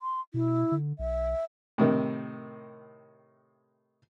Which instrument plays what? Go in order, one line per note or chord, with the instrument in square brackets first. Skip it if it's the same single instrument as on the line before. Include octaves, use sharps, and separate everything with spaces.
[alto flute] C6
[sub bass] B2 [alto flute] E4
[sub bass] D3
[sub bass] B1 [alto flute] E5
[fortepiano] A2 C3 D#3